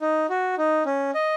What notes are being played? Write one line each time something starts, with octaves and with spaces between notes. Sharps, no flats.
D#4
F#4
D#4
C#4
D#5